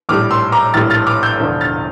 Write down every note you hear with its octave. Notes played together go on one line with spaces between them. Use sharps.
A#1 A2 G3 D6 F6
C6 E6
A#5 D6
A#1 A2 G3 F6 A6
F6 A6
D6 F6
E6 G6
E1 E2 D3 F3
F6 A6